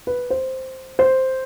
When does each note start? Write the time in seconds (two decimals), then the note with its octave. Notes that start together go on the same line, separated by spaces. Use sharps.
0.07 B4
0.30 C5
0.99 C5